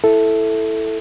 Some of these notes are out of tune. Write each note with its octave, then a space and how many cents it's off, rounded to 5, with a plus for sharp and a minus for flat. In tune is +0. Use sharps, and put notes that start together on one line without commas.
E4 +0 A4 +0 E5 +0